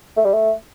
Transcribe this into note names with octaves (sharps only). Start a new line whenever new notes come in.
A3
G3
A3